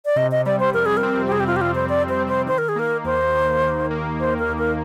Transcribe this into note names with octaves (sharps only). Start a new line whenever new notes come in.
D5
C3 D#5
D#5
G3 D5
C5
F2 A#4
G#4
A#4
C4
G4
C3 G#4
G4
F4
G4
G3 F4
C5
F2 D5
C5
C4
C5
D#3 C5
A#4
G#4
A#3 A#4
D#2 C5
D#2
D#3
A#3
D#2 C5
A#4
D#2
A#4